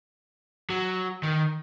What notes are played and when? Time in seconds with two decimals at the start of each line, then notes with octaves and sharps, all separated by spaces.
0.70 F#3
1.23 D#3